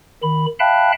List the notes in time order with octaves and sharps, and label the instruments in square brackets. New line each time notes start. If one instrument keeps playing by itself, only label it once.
[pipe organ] D#3 B5
E5 F5 G5 A5 B5 F#6